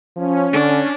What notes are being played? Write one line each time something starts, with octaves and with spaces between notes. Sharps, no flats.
F3 C#4
D3 D4